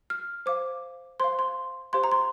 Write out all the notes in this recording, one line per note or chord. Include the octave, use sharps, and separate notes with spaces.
F6
C5 F5 D6
C5 F5 C6
C6
G4 C5 F5 C6
A#5
C6